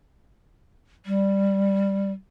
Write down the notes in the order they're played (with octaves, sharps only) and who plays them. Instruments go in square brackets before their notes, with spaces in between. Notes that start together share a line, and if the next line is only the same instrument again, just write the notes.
[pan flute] G3